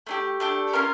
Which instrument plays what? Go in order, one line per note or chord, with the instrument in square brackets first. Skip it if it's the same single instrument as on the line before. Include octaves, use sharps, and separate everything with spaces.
[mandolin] A3 D4 G4
A3 D4 G4
C#4 F4 A#4